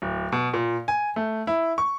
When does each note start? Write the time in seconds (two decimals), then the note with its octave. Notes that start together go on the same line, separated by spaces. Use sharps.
0.02 D1
0.32 B2
0.54 A#2
0.88 G#5
1.16 A3
1.47 E4
1.78 C#6